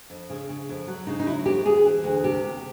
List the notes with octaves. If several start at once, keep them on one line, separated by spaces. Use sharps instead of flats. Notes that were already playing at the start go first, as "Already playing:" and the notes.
F2
C#3
C#3
F2
F#3
C#3 D#4
D#4
F#3 E4
F2 G4
D2 G#4
E3
D2
C3 G4
D2